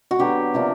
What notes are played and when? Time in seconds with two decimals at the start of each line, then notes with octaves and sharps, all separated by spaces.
0.11 F#4
0.19 D3 F#3 B3 D4 G4
0.54 C3 F3 A#3 D4